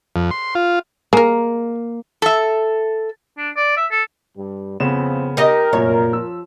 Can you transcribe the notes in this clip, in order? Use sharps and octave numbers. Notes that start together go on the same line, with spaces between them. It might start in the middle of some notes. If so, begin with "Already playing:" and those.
F2
C6
F4
G#3 A#3 A#4
A4 E5
D4
D5
E5
A4
G2 G3
F2 C#3 F3 B3 C4 E7
D#4 G4 A#4 D#5
F1 F#2 A#2 C#5
F3 E6